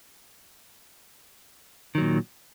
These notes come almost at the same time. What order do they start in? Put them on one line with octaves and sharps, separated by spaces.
D#3 F#3 A#2